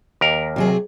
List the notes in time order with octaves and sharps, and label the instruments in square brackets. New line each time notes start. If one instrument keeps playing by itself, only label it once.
[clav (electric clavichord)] D#2 A#4
[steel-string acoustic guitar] C3 F#3 G#4